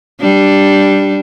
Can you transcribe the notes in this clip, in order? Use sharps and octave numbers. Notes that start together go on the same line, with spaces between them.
G3 D4